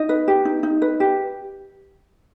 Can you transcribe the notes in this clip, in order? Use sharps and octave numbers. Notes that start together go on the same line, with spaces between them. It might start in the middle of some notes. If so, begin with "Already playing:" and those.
Already playing: D#4 D#5
B4
G4
D#4
D#4
B4
G4